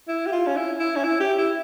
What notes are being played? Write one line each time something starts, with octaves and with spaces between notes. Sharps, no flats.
E4
G4
F4
C#4
E4
E4
C#4
E4
G4
E4